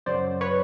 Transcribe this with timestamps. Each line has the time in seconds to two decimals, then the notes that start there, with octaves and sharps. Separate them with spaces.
0.06 F#2 C#3 F#3 C5 D5
0.41 B4 C#5